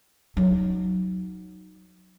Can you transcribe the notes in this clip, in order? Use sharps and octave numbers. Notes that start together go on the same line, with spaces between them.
F#3 D#4